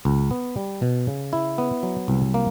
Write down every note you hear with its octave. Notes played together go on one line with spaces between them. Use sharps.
C#2
B3
G3
B2
C#3
E4
B3
F#3
C2
A#3